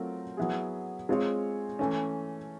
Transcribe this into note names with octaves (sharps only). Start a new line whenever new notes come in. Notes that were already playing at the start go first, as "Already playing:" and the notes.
Already playing: F#3 A3 C4 F4 A#4
F#3 B3 E4 G#4
G#3 C4 F4 G#4 C#5
E3 A3 C#4